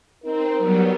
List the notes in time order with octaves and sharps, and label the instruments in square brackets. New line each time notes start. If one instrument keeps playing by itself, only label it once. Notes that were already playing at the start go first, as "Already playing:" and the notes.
[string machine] C4 [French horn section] D#4 A#4
[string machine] F#3 G3 B3